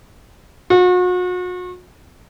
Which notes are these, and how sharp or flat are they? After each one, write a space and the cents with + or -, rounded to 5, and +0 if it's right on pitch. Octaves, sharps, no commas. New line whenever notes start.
F#4 -40